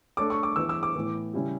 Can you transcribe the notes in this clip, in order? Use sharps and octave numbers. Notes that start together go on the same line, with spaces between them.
A3 D4 A4 C#5 D6
C#6
D6
E3 B3 E4 B4 E6
E6
D6
A2 E3 B3
C#3 G3 C#4 E4 G4